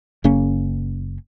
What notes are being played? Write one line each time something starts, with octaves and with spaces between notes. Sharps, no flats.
F#1 C#3 A#3 C#4